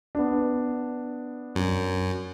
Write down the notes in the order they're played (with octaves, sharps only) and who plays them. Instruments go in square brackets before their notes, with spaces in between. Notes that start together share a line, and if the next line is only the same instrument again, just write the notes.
[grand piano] B3 D4
[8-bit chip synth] F#2